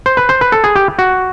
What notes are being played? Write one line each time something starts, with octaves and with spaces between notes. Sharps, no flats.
C5
B4
C5
B4
A4
G#4
G4
F#4